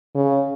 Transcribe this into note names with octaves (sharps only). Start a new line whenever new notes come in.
C#3